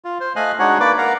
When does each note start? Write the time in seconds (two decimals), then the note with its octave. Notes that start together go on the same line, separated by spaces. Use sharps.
0.05 F4
0.20 C5
0.36 A3 D#5 F5 G#5 F#6
0.59 G#3 D4 D#4 F#4 C#5 F#5
0.80 A#3 B4 D5 D6
0.98 A#4 F5 F#5 A#5